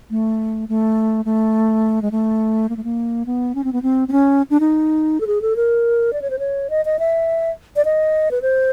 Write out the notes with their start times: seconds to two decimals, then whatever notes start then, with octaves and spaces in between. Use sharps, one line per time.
0.10 A3
0.69 A3
1.25 A3
2.02 G#3
2.11 A3
2.69 A#3
2.77 A3
2.84 A#3
3.26 B3
3.55 C#4
3.64 C4
3.73 B3
3.82 C4
4.08 C4
4.12 C#4
4.50 D4
4.60 D#4
5.21 A4
5.27 G#4
5.42 A4
5.56 A#4
6.13 D5
6.22 C#5
6.30 C5
6.39 C#5
6.70 D#5
6.85 D#5
6.99 E5
7.76 D5
7.85 D#5
8.31 B4
8.42 C5